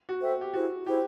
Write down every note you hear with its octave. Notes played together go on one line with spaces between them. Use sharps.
F#4
A4 C5 E5 G5
G4
E4 F#4 G#4 C5
E4 G4 G#4 C5